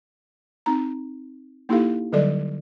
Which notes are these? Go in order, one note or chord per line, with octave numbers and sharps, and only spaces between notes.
C4 D#4 A#5
A#3 D#4 E4 G4 A4 F5
D3 F#3 G3 A4 D5 D#5